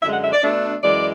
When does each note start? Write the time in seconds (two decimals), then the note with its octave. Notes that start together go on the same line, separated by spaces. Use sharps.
0.02 F#2 D3 G#3 E5
0.12 F#5
0.22 E5
0.32 D5
0.42 B2 A3 D4
0.83 F#2 E3 G#3 D5